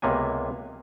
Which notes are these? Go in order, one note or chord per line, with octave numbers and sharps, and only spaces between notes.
C#2 C3 A#3 B3 G#5